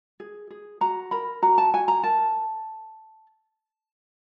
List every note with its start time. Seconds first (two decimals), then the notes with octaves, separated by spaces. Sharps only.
0.20 G#4
0.51 G#4
0.81 F#4 A#5
1.11 A#4 B5
1.42 F#4 A#5
1.58 A5
1.74 F#4 G#5
1.88 A#5
2.03 A#4 A5